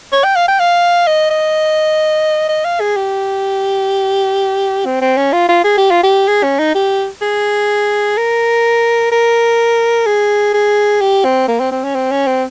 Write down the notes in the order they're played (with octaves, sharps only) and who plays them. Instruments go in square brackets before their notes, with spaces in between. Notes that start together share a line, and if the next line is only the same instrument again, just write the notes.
[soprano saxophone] C#5
G5
F5
G5
F5
D#5
D#5
D#5
F5
G#4
G4
C4
C4
C#4
F4
F4
G#4
G4
F4
G4
G#4
C#4
D#4
G4
G#4
A#4
A#4
G#4
G#4
G4
C4
A#3
C4
C4
C#4
C4
C#4
C4